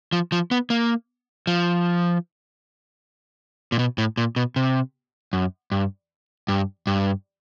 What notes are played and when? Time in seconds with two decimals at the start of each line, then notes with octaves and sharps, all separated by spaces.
0.13 F3
0.32 F3
0.51 B3
0.70 A#3
1.47 F3
3.72 A#2
3.79 B2
3.98 A2
4.17 A#2
4.36 B2
4.56 C3
5.33 F#2
5.72 G2
6.48 G2
6.87 G2